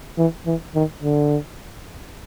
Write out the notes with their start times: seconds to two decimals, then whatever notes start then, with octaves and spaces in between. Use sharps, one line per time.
0.18 E3
0.46 E3
0.75 D#3
1.03 D3